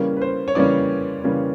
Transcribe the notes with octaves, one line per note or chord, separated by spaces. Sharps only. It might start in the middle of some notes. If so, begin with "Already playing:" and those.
Already playing: C#3 E3 G3 A#3 C#4 A#4
B4
C5
C#5
C#3 E3 G3 A#3 C#4 D5
C#3 E3 G3 A#3 C#4